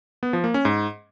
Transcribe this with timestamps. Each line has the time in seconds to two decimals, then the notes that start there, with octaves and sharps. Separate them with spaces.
0.23 B3
0.33 F3
0.44 A#3
0.54 C#4
0.65 G#2